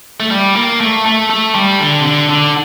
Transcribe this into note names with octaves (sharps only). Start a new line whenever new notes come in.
A3
G3
A#3
A3
A3
A3
G3
D3
C3
D3
D3